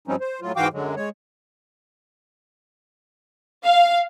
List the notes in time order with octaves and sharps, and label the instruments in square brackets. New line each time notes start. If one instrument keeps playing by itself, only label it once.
[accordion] G2 F3 G3 C4 C#4 D#4
C5
A2 F#3 F4
G#2 E3 F#4 F5 G5 D6
F#2 D3 F#3 G#3
G#3 C#5
[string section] F5